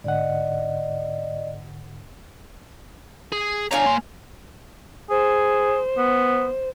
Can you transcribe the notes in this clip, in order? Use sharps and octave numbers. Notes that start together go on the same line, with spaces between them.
G#2 D3 D5 D#5 F#5
G#4
D4 C#5 F5 G#5 A#5
A#3 C6
G#4 C5
B3